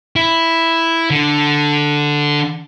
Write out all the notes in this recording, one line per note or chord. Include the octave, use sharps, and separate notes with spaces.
E4
D3